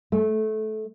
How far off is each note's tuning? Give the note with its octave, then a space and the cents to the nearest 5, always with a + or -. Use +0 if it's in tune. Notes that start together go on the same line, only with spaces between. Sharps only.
A3 -20